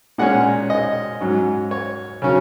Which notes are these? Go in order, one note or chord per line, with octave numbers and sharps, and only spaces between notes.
A#2 G#3 C#4 F#5
D#5
G#2 F#3 C#4
C#5
C#3 F#3 C#4